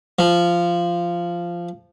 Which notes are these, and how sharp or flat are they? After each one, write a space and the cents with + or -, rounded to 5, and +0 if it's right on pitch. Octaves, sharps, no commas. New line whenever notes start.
F3 -10